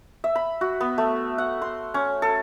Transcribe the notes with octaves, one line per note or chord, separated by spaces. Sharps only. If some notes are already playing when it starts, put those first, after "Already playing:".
E5
B5
F#4
B3
A3
F#5
C6
C#4
A4